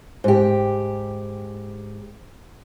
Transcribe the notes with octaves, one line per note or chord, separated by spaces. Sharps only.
G#2 G4